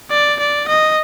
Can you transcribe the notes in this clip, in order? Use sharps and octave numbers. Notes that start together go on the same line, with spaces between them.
D5
D5
D#5